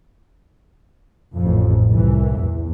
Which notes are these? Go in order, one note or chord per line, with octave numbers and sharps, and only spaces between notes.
A1 F2
C2 E3
E2